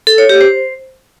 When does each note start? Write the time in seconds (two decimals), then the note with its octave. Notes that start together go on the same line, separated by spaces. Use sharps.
0.07 A4
0.18 C#5
0.29 G4
0.41 C5